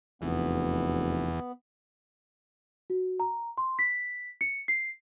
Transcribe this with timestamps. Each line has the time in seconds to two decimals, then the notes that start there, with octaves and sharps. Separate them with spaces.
0.22 F1 E2 B3
2.90 F#4
3.20 A#5
3.58 C6
3.79 B6
4.41 C#7
4.68 C7